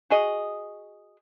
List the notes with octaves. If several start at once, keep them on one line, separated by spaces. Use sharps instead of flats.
F#4 G#4 D#5